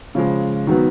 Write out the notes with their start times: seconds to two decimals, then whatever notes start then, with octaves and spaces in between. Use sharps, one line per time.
0.15 C#3 F3 G#3
0.67 D#3 F#3 B3